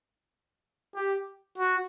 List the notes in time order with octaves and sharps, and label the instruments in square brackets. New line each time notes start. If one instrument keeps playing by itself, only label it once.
[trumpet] G4
F#4